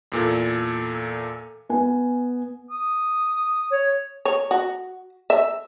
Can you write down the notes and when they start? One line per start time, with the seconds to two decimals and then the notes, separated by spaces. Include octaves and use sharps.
0.12 E2 A#2 A4
1.69 B3 G#5
2.71 D#6
3.70 C#5
4.25 C#5
4.51 F#4
5.30 E5